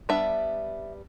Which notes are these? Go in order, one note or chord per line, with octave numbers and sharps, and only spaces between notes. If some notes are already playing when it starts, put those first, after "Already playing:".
G3 B3 D4 E5